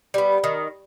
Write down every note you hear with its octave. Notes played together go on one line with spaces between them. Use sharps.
G3 B3
D#3